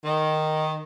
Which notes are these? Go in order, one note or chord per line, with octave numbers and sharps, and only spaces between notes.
D#3